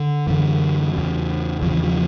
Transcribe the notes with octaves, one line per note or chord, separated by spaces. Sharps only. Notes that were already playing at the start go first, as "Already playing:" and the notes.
Already playing: D3
F#2 D3 E3
E2 C#3
E2 C#3 F3
E3
F3